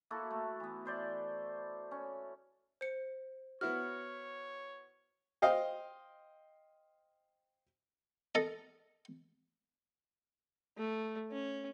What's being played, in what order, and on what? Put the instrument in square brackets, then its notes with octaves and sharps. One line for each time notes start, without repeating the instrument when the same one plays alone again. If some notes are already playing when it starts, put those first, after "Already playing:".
[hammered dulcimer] A#3 E4 F#4 A4
A3
E3 B3
E4 C5 D5
C#4
[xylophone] C5 C#7
[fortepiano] B3 E4 F#4 [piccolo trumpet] C#5 [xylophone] F6
[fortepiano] C5 D#5 F5 G5
[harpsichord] A4 D#5
[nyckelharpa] A3
C#4